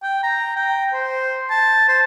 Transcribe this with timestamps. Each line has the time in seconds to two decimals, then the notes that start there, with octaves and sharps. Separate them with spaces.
0.03 G5
0.23 A#5
0.56 G5
0.93 C5
1.50 A5
1.88 C5